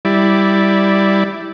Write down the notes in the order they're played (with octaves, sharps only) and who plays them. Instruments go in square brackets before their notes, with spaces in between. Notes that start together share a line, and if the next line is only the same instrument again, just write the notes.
[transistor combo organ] G3 E4 D5